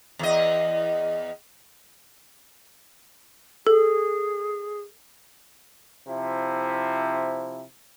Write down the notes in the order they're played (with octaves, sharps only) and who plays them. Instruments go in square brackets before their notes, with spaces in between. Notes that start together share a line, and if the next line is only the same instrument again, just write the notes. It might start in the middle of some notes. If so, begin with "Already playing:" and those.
[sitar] E2 D#5
[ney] G#4 [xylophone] A4
[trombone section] C3 F3 E4